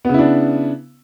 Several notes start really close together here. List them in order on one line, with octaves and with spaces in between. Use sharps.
B3 C#3 E4 D4